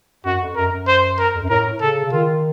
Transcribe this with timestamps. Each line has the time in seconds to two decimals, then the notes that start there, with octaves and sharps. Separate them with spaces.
0.25 F#2 F#4
0.40 F2
0.55 F#2 A#4
0.71 F#2
0.87 C5
1.19 A#4
1.35 F2
1.42 F#2
1.50 A2 A#4
1.81 C#3 A4
2.04 C#3
2.12 D#3 F4